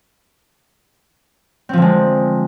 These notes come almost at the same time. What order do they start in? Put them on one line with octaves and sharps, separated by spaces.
C4 F3 D3 G#3